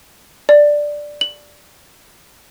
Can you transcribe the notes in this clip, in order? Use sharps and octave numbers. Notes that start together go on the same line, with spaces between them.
D5
F#7